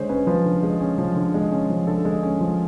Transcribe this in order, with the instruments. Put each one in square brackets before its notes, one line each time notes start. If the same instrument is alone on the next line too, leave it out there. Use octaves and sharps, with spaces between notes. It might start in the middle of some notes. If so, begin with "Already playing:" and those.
Already playing: [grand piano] D3 G#3 C5 C#5
C#4 B4
F3 B4
D3
G#3
C#4
F3
D3
G#3
C#4
F3
D3 A4
G#3
C#4
F3